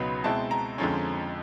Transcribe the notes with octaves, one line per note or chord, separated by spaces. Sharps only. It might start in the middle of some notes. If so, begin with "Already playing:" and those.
Already playing: C#2 B2 F#3 B3 D#4 B5
B2 G#3 C4 E4 A5
A#5
F2 D3 F3 G#3 C#4